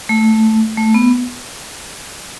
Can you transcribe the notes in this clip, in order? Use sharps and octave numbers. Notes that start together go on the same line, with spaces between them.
A3
A3
B3